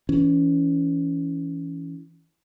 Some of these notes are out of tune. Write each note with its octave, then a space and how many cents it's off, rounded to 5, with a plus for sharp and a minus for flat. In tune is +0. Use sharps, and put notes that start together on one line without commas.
E3 +0 C#4 +20